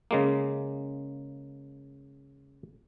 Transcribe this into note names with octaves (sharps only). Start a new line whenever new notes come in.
C#3 G#3 A#3